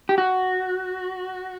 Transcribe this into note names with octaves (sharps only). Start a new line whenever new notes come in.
G4
F#4